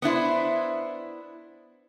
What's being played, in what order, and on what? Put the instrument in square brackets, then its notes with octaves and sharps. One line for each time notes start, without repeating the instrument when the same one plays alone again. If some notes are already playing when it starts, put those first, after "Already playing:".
[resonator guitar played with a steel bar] B3 D4 E4 C5